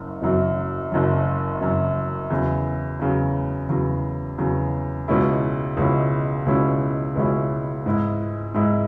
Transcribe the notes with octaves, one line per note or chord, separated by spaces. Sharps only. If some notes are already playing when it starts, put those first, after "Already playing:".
Already playing: F#1 F#2 F#3
F#1 F#2 F#3
F#1 F#2 F#3
F#1 F#2 F#3
E2 C#3 F#3
E2 C#3 F#3
E2 C#3 F#3
E2 C#3 F#3
C#2 B2 G#3 C#4 E4
C#2 B2 G#3 C#4 E4
C#2 B2 G#3 C#4 E4
C#2 B2 G#3 C#4 E4
G#2 G#3 E4
G#2 G#3 E4